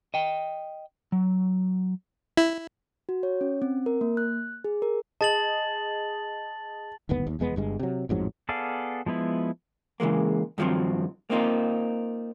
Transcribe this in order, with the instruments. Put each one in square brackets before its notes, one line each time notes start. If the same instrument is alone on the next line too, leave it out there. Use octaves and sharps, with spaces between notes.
[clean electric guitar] D#5 G5
F#3
[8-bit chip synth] E4
[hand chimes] F#4
C#5
C#4
C4
A#4
A#3
F#6
G#4
A#4
[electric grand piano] G#4 D#5 [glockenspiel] A5 A6 F#7
[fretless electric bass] D1 G1 D#2 B3
D#2
F1 E2 G#3 B3
G1 G2 G#3
C3 F#3
A1 F2 G#2 F#3
[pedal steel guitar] B3 G#4 A4 D5 F5
F3 G#3 B3 E4
[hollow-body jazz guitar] C#3 E3 G#3 A#3
G2 D#3 F3 F#3 C4
A#3 C4 D#4 F4